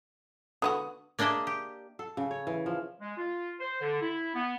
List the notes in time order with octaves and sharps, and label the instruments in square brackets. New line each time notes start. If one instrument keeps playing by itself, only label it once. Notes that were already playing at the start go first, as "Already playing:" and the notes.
[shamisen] D3 B3 F#4 [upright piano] D#6
[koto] A#3 D4 G#4 D#5 E5
G4
[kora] A4
C#3
C#5
E3
F3
[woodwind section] G#3
F4
C5
D3
E4
B3